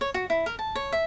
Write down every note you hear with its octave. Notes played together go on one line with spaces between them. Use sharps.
C#5
F#4
E4
A#4
A5
C#5
E5